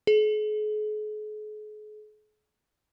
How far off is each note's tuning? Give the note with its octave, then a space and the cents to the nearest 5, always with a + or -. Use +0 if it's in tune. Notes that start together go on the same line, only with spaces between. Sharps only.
G#4 +45